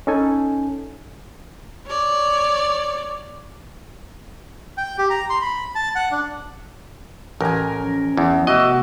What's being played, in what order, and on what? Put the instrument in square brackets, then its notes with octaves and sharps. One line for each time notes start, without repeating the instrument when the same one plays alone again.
[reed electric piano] C#4 D#4 A4 G#5
[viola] C#5 D5
[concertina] G5
G4
A#5
C6
B5
A5
F#5
D4
[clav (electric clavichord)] A1 [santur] A#4 G#5
[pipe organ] F3 C#4
[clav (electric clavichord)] E2
[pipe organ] C3 A3 B3 [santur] F#4 E5 D6 [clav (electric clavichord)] D#5